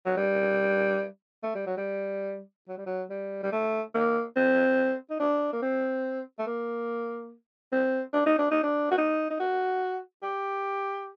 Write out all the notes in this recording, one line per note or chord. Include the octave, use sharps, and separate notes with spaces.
F#3
G3
A3
G3
F#3
G3
F#3
G3
F#3
G3
G3
A3
A#3
C4
D#4
D4
A#3
C4
A3
A#3
C4
D4
D#4
D4
D#4
D4
F#4
D#4
D#4
F#4
G4